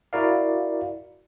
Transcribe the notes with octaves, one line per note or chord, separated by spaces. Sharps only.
E4 F#4 A#4 D5 F5